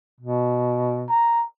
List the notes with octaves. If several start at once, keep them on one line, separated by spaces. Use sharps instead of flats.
B2
A#5